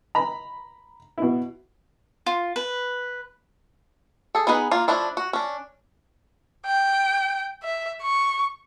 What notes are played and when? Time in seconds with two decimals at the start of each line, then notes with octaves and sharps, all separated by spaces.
0.15 A#5 B5
1.18 B2 E4
2.26 F4
2.56 B4
4.35 G#4 A4
4.47 B3 D#4 G#4 B4
4.71 A#3 F4
4.88 F3 A3 D4 E4
5.17 F#4
5.33 C#4 D4
6.66 G5
7.63 E5
8.02 C#6